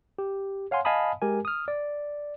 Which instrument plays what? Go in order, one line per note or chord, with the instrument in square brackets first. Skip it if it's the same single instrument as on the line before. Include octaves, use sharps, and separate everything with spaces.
[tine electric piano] G4
C#5 F5 F#5 G#5 C6
D#5 F5 G#5 A5 B5 D#6
G#3 G4 A#4 G#5
D#6 F6
D5